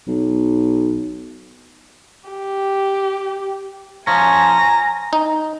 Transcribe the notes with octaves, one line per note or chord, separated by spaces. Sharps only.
B1
G4
F3 C#4 G#5 A#5
D#4